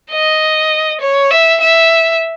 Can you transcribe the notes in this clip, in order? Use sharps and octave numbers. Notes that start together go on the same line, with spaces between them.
D#5
C#5
E5
E5